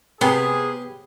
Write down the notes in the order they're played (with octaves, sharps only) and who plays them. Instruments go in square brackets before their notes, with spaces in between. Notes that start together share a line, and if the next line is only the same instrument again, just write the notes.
[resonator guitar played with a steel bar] C3 [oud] B3 [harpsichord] G4 [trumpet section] G#4